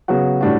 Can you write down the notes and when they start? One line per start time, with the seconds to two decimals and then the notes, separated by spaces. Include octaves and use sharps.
0.08 C#3 F#3 B3 F#4
0.41 A2 G3 D4 F#4